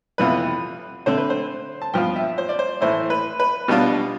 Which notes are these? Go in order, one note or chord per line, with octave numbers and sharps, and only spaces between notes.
F2 C3 E3 B3 F4 B4
D3 A3 C4 C5
B4
C5
A5
G2 F3 B3 F4 G5
E5
C5
D5
C5
A2 E3 A3 E4 C5
B4
B4
B2 G3 B3 D4 F4